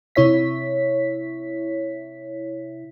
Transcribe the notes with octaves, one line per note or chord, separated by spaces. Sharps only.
C3 E4 C#5 E5 B6